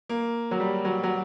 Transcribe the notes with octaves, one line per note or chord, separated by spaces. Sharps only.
A#3
F#3
G3
F#3
F#3